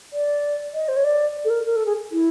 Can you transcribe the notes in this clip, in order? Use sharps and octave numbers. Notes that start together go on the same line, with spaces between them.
D5
D#5
C5
C#5
D5
A4
A#4
A#4
A4
G#4
E4